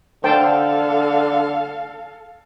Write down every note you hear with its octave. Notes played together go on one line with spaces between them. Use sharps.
D3 A4 C5 F5 G5 A5